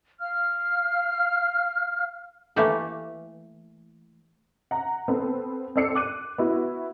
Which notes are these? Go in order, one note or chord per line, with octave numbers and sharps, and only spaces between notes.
F5 F6
E3 A3 A#3 G4 A4
F#5 A#5
B3 C4 A4
C4 A4 D5 E6 C7 C#7
D6 F#6 D#7
B3 E4 F#4